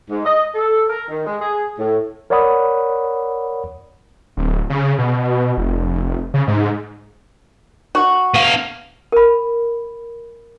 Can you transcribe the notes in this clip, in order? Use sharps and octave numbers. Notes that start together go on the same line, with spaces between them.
G#2
D#5
A4
A#4
D#3
G#3
G#4
A2
A#4 C#5 D5 F#5 B5 D#6
D1
C#3
B2
F1
C#3
G#2
F#4
B3 F5
A#4 B5